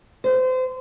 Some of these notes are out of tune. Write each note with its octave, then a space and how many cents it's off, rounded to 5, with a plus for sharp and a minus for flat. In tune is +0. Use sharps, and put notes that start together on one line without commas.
C5 -30